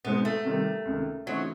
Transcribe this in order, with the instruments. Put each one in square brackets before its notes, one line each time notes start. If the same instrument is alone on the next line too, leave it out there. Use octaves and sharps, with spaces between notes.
[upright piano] B2 G#3 C4 D#4 [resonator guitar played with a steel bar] B3
[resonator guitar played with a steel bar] A3
[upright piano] C3 D#3 G3
C#2 C3 D#3
[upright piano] C#3 E3 A3 C4 D#4 [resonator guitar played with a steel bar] F#3